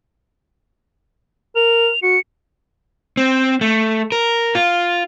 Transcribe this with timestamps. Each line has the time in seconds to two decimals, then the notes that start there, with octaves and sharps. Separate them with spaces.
1.56 A#4 F7
2.02 F#4 C#7
3.17 C4
3.61 A3
4.12 A#4
4.55 F4